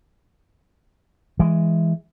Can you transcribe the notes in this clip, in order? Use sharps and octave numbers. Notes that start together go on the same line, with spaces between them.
E3 G#3